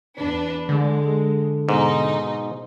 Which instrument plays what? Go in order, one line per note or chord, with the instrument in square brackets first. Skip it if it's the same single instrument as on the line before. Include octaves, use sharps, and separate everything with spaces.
[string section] E2 D4 B4
[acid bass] D3 [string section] G#3
[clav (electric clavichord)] G#2 [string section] B2 D#4